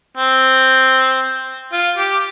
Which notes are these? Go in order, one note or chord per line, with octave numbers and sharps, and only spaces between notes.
C4
F4
G4